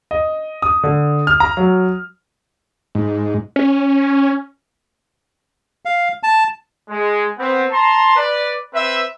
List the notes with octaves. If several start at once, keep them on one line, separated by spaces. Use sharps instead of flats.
D#5
D#6
D3
F6
A#5
F#3
G#2
C#4
F5
A5
G#3
B3 C4
A5 A#5 C6
B4 D5
C4 B4 E5